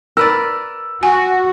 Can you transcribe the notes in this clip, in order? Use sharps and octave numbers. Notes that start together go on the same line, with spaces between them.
A#4 B4 D5 E6
F#4 G#5